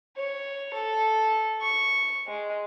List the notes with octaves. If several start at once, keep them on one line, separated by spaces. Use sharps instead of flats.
C#5
A4
C#6
G#3